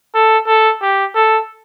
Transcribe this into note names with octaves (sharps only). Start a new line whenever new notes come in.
A4
A4
G4
A4